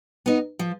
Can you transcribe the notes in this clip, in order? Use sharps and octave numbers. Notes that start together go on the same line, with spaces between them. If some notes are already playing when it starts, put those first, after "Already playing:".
B3 D#4
F3